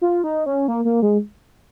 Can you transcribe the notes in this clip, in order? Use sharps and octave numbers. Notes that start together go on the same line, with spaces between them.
F4
D#4
C#4
A#3
A#3
G#3